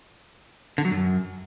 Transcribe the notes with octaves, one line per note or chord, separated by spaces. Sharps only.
D3
F#3
F#2